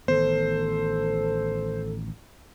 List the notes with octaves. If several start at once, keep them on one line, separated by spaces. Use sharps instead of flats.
A1 D#3 B3 A4 C5